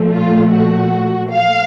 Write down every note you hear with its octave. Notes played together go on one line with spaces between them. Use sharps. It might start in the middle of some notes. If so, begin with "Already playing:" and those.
Already playing: A#2 F3 A3
F4
F#4
F5